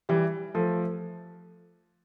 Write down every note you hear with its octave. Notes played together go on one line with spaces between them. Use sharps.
E3 G3
F3 A3